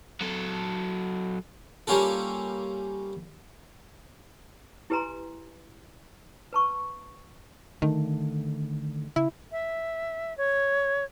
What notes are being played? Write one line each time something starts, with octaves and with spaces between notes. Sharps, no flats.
F#3 A4
G3 A#3 C#4 F4 A4
E4 G4 B4 G#5 A#5 C6
B4 A5 C#6
D3 D#3 A3
C#3 E4
E5
C#5